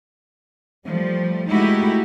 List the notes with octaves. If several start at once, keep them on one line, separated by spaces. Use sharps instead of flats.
F3 G3 A3
G#3 A3 D#4 E4 F#4 G4